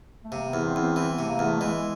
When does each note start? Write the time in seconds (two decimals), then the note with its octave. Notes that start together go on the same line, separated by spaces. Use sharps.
0.24 A3
0.32 C3 A#3
0.48 B3
0.54 E2
0.65 C4
0.76 E2 C4
0.96 E3 C4
1.13 B3
1.19 C3 A3
1.29 A#3
1.39 E2
1.45 A3
1.61 E3 G#3